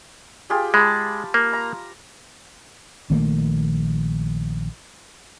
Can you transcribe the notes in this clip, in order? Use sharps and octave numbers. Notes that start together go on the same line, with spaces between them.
F4 G4 G#4
G#3 A5 B5
A#3
A#5
A#1 D#3 A3 A#3